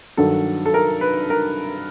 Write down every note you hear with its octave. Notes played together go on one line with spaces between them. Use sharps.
G2 D#3 F#3 A4
A4
A#4
B4
A#4